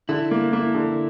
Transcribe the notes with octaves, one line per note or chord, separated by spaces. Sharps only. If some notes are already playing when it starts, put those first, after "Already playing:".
D3 E4
A#3
A#3 E4
D3